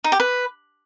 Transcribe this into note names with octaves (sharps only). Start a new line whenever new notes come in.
D#4
G4
B4